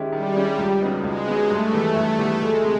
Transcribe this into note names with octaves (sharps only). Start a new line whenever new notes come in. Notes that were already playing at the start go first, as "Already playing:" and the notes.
Already playing: D#3 G#3 C#4 E4 G4
D#3 G3
G#3 C#4 E4 G4
C#2
C#3 F#3 B3 D#4
C#2 G#3
C#3 F#3 B3 D#4
G2 A3
E3 G3 B3
G2
E3 G3 B3
D2 G#3
C3